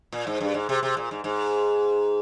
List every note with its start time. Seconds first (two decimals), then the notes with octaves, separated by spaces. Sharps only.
0.13 A#2
0.27 G#2
0.41 G2
0.54 G#2
0.69 C3
0.83 C3
0.97 A#2
1.11 G#2
1.24 G#2